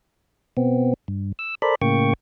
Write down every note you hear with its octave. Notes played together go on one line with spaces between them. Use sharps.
B2 B3 C4
G2
E6
A4 A#4 C5 D5 B5
A2 C#3 A#3 G5 C#6